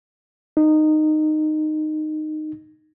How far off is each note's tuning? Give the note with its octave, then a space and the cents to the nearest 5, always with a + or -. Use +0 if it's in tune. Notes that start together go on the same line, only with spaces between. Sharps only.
D#4 -15